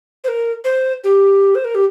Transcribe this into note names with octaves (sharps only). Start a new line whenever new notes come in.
C5
A#4
C5
G4
C5
A#4
G4